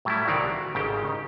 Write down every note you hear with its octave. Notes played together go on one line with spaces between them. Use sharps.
A2 F#3 G3 A3 E4
C2 D#3 E3 F#4 D5 F5
F#4
G#1 G#2 C#3 G4 A4 G5
D#3 D#4 D#5